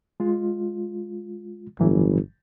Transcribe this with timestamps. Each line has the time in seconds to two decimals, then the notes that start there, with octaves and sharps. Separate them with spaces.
0.20 G#3 F4
1.80 G1 A2 E3 F#3